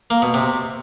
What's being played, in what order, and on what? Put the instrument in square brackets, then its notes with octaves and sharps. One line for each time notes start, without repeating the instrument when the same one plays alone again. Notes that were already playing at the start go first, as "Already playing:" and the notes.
[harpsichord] A#3
B2
C3